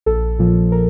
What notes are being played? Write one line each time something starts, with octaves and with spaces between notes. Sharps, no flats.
A#1 A4
A#2 F3
A#4